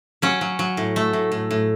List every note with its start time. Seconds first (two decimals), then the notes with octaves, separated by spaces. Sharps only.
0.22 F#3 C#4
0.41 F#3
0.59 F#3
0.77 A2
0.96 A3
1.13 A2
1.32 A2
1.51 A2